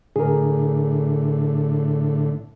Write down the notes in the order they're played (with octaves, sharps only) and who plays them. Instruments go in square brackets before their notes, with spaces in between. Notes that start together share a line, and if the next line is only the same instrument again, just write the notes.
[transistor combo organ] A2 D3 [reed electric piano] G#4 A#4